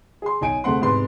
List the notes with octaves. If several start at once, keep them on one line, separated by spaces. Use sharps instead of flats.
G#4 C6
B1 D#4 G#5 D7
F1 G#3 A3 C4 F#5 C6
E2 G#2 C3 B4 C6